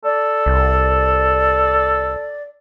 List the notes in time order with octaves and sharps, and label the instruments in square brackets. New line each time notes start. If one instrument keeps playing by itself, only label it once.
[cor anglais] A4 [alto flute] D5
[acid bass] C2